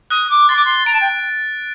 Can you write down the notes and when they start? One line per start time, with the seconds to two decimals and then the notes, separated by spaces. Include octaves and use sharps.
0.10 D#6 F#6
0.30 D6
0.49 C6 A6
0.56 D6
0.65 C6
0.86 A#5 D7
0.93 A5
1.00 G5